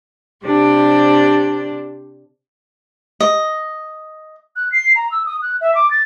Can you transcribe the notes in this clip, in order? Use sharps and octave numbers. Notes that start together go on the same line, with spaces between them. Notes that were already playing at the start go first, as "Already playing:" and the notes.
C3 D4 G4 C5 D5
D#5
F#6
C7
A#5
E6
D#6
F#6
E5
D6
A6